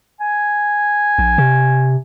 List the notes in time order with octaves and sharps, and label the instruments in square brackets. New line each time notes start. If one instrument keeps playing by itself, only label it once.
[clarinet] G#5
[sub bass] A#1
C3